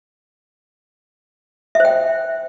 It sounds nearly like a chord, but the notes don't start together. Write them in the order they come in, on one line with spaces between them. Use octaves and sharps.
E5 C5 G5